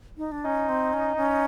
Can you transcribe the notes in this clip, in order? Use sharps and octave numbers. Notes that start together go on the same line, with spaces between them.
D#4
D4
C#4 D#4
C4
C#4
C#4